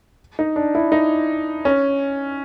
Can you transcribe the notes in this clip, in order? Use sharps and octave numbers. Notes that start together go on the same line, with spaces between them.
D#4
D4
E4
D#4
C#4